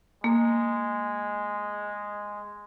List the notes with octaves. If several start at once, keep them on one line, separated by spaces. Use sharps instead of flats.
G#3 A#3